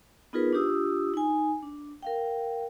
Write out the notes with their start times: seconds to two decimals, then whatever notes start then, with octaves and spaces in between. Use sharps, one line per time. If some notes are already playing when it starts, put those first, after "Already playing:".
0.33 B3 D#4 F4 G#4 A#4 B4
0.53 D4 F4 G4 D#6 E6
1.14 D#4 G#5
1.62 D4
2.03 A#4 F5 G5